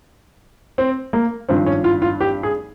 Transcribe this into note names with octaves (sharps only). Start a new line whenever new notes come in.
C4
A#3
G#1 G2 F3 C4
C#4
F4
F4
G4
G#4